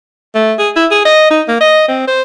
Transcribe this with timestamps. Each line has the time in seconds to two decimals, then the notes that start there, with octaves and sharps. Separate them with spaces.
0.35 A3
0.59 G#4
0.76 E4
0.91 G#4
1.05 D#5
1.30 D#4
1.48 A#3
1.61 D#5
1.88 C4
2.08 C5